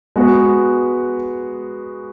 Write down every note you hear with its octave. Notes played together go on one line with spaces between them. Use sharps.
G#3 B3 F#4 B4